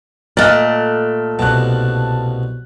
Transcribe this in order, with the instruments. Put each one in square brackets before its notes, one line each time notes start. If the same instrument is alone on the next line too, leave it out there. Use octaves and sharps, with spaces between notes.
[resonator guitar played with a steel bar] A#2 A3 [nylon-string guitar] D5 D#5 [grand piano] F6 F#6 A6
[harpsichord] C2 B2 [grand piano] A5 F#6